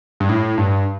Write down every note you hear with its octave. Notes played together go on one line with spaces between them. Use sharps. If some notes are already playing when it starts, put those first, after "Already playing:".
G2
A2
G2